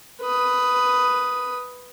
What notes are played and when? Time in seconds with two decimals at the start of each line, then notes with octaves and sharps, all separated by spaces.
0.22 B4 D#6